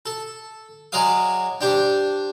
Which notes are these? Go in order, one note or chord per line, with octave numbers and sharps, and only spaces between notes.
A4
F#3 G#3 D5 F5 D#6
D4 G4 C5